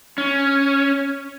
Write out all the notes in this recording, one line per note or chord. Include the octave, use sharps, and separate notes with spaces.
C#4